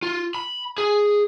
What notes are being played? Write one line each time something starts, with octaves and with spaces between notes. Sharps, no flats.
F4
B5
G#4